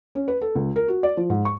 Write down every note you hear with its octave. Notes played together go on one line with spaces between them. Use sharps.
C#4
B4
A4
C#2
A#4
F#4
D5
F3
G#2
C#6